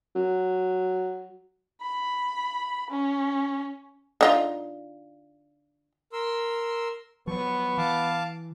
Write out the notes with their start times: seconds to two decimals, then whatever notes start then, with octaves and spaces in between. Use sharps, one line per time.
0.16 F#3
1.82 B5
2.90 C#4
4.21 D3 D#4 F4
6.13 A#4 C6 E6
7.27 F3 F#3 B3 C#6
7.77 E3 F5 A5 D6